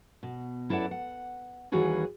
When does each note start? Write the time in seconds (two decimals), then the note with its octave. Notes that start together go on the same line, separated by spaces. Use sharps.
0.23 B2
0.69 F#2 E4 A4 B4 D5 F#5
0.91 F#5
1.72 D#2 E3 G3 F#4 G#4 B4